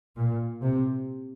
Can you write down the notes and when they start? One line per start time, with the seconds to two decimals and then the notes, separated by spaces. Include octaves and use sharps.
0.17 A#2
0.62 C3